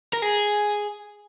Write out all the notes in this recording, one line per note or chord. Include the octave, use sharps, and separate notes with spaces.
A#4
G#4